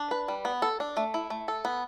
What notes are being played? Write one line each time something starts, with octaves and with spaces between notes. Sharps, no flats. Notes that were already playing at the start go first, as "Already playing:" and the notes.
Already playing: D4
B4
G3
B3
A4
D4
A3
E4
A3
A4
B3